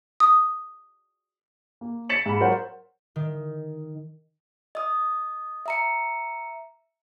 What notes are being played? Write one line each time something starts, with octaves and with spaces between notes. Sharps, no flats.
D#6
A#3
A6 B6 C#7 E7 F#7
G#2 B5
F#3 F#4 A#4 C5 C#5 F#5
D#3
D#5 D#6
E5 A#5 C#7